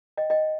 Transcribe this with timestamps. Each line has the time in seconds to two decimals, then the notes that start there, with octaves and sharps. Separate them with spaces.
0.17 D#5 G5
0.30 D#5 G5